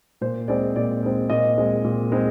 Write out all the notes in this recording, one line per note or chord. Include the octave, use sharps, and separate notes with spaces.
A#2 C5
G#3 C4 D5
A#2 D5
G#3 C4
A#2 D#5
G#3 C4
A#2
G#3 C4